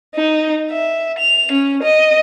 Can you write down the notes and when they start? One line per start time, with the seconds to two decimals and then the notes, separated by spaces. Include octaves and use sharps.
0.15 D#4
0.71 E5
1.19 F7
1.52 C#4
1.83 D#5